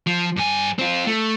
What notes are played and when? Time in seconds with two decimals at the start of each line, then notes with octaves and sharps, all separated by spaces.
0.07 F3
0.37 G2 G#5
0.79 C4 F4
1.07 A3